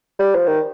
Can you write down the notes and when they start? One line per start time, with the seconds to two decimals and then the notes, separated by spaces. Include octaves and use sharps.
0.19 G3
0.35 F3
0.47 D#3